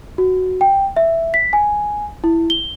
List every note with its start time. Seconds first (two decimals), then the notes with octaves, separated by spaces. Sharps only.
0.18 F#4
0.61 G5
0.96 E5
1.34 B6
1.53 G#5
2.24 E4
2.50 G7